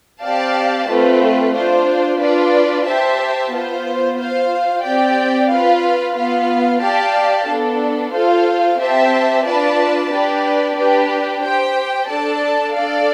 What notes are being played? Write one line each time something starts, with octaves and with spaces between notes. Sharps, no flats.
C4 G4 D5 F5 A5
A3 C4 F4 B4
D4 F4 C5
D4 F4 B4 D5
G4 C5 E5 A5
B3 F4 C5
F4 C5 F5
C4 G4 D5 G5
F4 B4 F5
B3 F4 B4 F5
G4 D5 F5 A5
B3 D4 A4
F4 A4 C5 F5
C4 G4 C5 E5 A5
D4 F4 B4 D5 A5
D4 G4 B4 D5
D4 G4 B4
G4 C5 G5
D4 A4 D5 A5
D4 A4 D5 F5